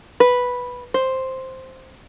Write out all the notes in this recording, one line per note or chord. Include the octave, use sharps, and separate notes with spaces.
B4
C5